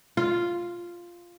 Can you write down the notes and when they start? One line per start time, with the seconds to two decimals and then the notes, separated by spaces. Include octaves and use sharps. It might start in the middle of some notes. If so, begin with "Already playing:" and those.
0.17 F4